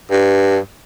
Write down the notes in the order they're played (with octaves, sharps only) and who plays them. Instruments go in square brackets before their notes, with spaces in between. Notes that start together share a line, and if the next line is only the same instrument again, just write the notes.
[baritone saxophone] G2